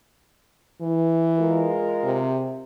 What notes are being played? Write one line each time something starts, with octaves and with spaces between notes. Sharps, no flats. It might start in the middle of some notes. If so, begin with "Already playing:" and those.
E3
G#3 F4 A#4
C3